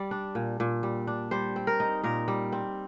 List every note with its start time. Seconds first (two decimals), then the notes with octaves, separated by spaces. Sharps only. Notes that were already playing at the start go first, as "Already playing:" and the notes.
Already playing: G3 D5
0.11 D4
0.35 A#2
0.60 A#2
0.83 G3
1.07 D4
1.31 G3 C5
1.56 C4
1.67 A#4
1.80 D#4
2.03 A#2 A#4
2.28 G3
2.52 C4